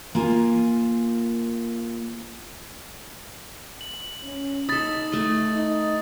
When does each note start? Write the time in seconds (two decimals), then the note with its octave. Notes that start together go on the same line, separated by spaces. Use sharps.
0.15 A#3 F4 G#5
3.81 F#7
4.23 C#4
4.69 D#4 A4 B5 D#6 A6
5.12 A3 D#5
5.55 D#4